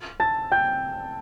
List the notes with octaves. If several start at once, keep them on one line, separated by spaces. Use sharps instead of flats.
A5 A6
G5 G6